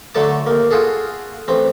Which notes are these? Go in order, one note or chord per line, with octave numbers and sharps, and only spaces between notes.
D3 F#3 A3 A4 A5 D6
D#2 A#3
F4 F#4 G#4 A4
A1 C4